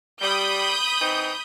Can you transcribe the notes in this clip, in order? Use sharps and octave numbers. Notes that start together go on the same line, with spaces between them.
G3 B5 D#6 G6
E3 C4 D#4